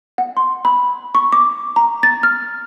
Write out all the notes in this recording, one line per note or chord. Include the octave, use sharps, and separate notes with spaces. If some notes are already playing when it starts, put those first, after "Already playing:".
F#5
C6
B5
C#6
D6
A#5
A6
F6